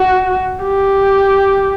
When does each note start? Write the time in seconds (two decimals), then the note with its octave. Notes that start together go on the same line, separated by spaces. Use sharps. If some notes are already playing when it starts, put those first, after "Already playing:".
Already playing: F#4
0.63 G4